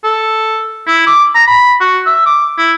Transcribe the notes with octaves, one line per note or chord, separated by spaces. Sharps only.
A4
E4
D6
A#5
B5
F#4
E5
D6
E4